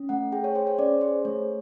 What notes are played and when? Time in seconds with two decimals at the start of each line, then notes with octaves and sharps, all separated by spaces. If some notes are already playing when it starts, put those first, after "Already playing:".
Already playing: C#4
0.09 A3 F#5
0.32 G#4 G5
0.44 C#5
0.55 G#4 C5
0.67 C#5
0.78 C#4 D5
1.01 G#4 C5
1.25 A3 C#5